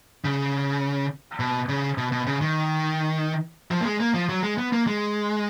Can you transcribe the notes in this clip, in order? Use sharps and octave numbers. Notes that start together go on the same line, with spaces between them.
C#3
B2
C#3
B2
B2
C#3
D#3
F3
A#3
G#3
A#3
F3
F#3
G#3
B3
A#3
G#3